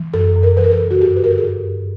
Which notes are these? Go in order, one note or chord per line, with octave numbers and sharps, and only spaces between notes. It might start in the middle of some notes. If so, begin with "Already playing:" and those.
Already playing: E3
F#2 A4
F#2
A#4
E3 B4
A#4
A4
C#3
F#4
G2 G4
B4
D3 A#4
A4
G#4
G2 G4
G2